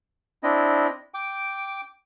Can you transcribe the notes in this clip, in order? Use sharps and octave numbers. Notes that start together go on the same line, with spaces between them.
C4 D4 E4 D#5
G5 D6